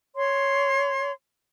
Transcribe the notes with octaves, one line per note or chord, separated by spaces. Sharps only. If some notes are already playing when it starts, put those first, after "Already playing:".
C#5 C6